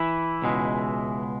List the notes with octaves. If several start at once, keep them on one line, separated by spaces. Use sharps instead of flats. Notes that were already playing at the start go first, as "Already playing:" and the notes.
Already playing: E3 E4
C#2 B2 G#3